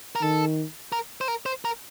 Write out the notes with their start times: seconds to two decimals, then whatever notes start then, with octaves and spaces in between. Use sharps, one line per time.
0.16 A#4
0.22 D#3 A4
0.92 A#4
1.21 C5
1.28 A#4
1.46 C5
1.65 A#4